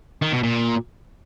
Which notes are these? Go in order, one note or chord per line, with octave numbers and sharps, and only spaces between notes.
D#3
B2
A#2